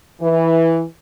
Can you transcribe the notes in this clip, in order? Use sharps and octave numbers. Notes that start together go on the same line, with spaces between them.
E3